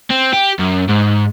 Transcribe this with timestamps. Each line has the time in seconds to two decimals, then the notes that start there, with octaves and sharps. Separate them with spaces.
0.10 C4
0.33 G4
0.59 F#2
0.88 G#2